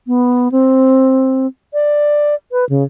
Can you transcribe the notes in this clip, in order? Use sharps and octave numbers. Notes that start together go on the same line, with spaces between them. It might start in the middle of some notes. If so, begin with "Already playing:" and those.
B3
C4
D5
B4
C#3